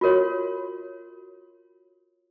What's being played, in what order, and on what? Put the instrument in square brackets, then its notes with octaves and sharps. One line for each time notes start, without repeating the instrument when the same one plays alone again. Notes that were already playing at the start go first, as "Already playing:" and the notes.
[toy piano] F4 F#4 A#4 C#5